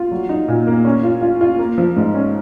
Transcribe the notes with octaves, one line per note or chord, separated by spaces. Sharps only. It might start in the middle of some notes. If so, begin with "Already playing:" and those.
Already playing: F4
F#3
D#4
A#2
A#3
C#4
F4
F4
F4
A#3
F3
G#2
C#4